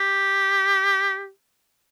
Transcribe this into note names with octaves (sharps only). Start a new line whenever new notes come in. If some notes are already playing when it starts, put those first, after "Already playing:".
Already playing: G4